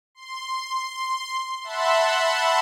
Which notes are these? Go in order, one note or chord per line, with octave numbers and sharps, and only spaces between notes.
C6
E5 F#5 A5 B5 C6